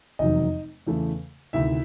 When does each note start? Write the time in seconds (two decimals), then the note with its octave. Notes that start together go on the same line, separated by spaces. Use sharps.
0.19 F1 E2 C3 D#3 F#3 D#4 D#5
0.86 E2 C#3 E3 A3
1.53 D2 C3 D#3 E4 E5